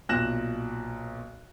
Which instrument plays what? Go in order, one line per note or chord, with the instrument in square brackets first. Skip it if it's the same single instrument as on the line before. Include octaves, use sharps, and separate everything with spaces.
[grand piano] B1 A#2 F#6 A#6 E7